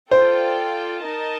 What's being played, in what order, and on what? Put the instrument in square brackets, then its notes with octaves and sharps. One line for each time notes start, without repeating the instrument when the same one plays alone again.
[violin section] F4 A4 D5 G5 [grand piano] C5
[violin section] D#4 A#4 D#5 A5